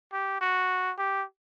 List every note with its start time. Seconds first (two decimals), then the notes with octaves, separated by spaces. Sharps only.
0.13 G4
0.41 F#4
0.98 G4